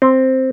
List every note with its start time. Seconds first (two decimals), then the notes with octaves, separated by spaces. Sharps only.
0.02 C4